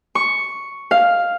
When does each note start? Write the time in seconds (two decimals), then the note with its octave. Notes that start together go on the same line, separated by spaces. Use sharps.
0.15 C#6
0.91 F5